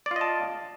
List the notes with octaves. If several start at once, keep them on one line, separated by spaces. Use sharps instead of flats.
F4 D5 D#5 A5